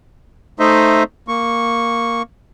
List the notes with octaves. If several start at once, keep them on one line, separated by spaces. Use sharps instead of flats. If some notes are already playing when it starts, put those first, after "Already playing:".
A3 D#4 C5 D#5 E5
A#3 C#6